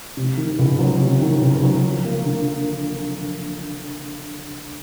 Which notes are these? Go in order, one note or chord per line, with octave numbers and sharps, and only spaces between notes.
C3
D#3
C#2
F#3
C3
D#3
C#2
F#3
F3
A#3
D3